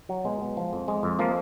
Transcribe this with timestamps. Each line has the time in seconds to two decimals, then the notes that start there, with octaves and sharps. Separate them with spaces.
0.09 F#3
0.24 B2 G#3
0.41 B2
0.57 F3
0.73 F2
0.88 G#3
1.03 F2
1.19 F3 A#3